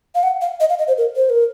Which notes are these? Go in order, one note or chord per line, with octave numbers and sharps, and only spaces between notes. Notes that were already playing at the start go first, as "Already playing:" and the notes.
F5
F#5
F5
D#5
F5
D#5
C5
A#4
C5
A#4